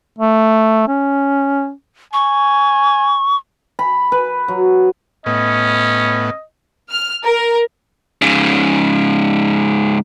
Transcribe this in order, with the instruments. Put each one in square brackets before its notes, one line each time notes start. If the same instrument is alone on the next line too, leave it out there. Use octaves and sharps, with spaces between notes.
[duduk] A3
C#4
[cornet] G#5 [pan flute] C#6
[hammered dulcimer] B5
B4
F#3
[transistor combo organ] A2 B3 [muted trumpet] C#4 [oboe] D#5
[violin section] F6
A#4
[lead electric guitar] G#2 C#3